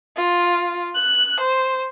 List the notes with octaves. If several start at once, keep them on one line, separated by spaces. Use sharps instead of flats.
F4
F#6
C5